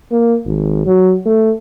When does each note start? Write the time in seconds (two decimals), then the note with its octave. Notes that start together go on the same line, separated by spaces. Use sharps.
0.12 A#3
0.46 G#1
0.86 F#3
1.26 A3